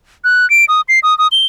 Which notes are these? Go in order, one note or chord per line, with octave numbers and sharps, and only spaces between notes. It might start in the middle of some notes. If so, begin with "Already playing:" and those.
F#6
D7
D#6
C7
D#6
D#6
G7